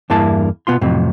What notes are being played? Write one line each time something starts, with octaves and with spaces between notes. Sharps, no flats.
E2 G2 A#3 E4 A5
B2 B3 F4 C6
F2 A2 C3 F#3